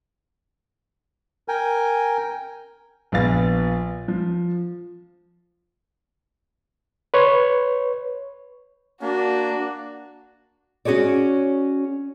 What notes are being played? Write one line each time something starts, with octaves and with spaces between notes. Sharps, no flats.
A#4 G5 G#5
A#1 F3 B3 F5 A6
F3
B4 C#5
A#3 D4 F#4
C#4 F#4 G#4 C#5 D5